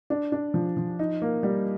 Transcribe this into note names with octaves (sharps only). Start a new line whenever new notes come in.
D4
D4
F3
F3
D#4
A#3
G3